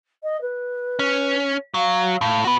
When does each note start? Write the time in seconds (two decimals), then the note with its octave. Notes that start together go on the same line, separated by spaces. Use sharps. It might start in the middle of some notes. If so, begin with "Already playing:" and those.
0.23 D#5
0.41 B4
0.99 C#4
1.74 F#3 F5
2.21 A2 F5
2.45 B3 F#4 B4